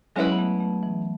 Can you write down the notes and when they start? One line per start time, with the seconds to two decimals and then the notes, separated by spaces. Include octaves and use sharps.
0.16 F#3 G#3 C#4 E4 B4
0.31 B3
0.38 A3
0.60 A3
0.83 E3